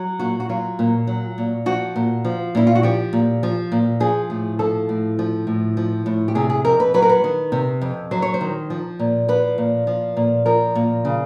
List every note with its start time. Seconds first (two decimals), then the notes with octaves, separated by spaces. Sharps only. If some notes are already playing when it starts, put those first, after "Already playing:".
Already playing: F#3
0.19 A#2 F#4
0.40 F#4
0.49 F#3 F4
0.79 A#2
1.07 F#3
1.38 A#2
1.66 F3 F#4
1.96 A#2
2.25 F3
2.55 A#2 E4
2.67 F4
2.75 F#4
2.83 F3 G4
3.13 A#2
3.43 F3
3.72 A#2
4.00 F3 G#4
4.30 A2 G#4
4.59 F3 A4
4.89 A2
5.19 F3
5.47 A2
5.77 F3
6.06 A2
6.28 G4
6.35 C3 G#4
6.50 G#4
6.65 F2 A#4
6.80 B4
6.94 F#3 B4
7.02 A#4
7.09 B4
7.24 D#3
7.52 C3
7.82 F2
8.11 F#3 C5
8.22 C#5
8.34 C5
8.41 D#3
8.70 F3
8.99 A#2
9.28 F3 B4
9.58 A#2
9.87 F3
10.17 A#2
10.46 F3 A#4
10.75 A#2
11.05 C#3